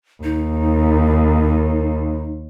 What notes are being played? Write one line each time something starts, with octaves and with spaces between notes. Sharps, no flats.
D#2 D#4